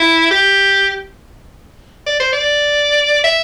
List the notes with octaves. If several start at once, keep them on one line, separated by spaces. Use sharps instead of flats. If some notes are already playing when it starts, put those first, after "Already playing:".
Already playing: E4
G4
D5
C5
D5
E5